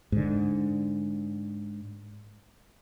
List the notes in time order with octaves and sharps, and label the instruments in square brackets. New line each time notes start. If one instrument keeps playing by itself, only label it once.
[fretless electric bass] G#2 D3